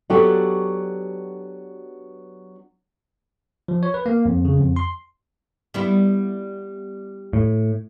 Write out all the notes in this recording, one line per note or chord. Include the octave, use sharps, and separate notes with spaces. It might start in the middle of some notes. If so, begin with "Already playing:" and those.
F#3 B3 D4 F#4 G4 A4
F3
C#5
B4
A#3
F2
C#3
F2
C6
G3 B3 E4
A2